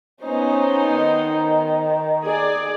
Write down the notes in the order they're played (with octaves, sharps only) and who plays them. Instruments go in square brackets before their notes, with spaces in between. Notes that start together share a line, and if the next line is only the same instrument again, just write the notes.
[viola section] B3 D#4 C5 [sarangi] C#4
[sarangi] D#3
[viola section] G#4 D5